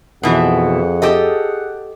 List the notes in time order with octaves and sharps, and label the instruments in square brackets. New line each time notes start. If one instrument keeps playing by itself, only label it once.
[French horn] F2 [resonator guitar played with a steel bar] B2 E3 [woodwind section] G#4 F#5
[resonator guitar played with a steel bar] G4 A4 D#5